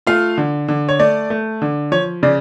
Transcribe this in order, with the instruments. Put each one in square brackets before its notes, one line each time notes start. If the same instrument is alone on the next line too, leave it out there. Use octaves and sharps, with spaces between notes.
[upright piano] A3 F4 F5
D3
D3
C#5
A3 D5
A3
D3
F3 C#5
C#3 D5